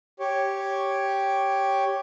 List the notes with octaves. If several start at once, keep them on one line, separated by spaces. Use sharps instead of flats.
G4 C#5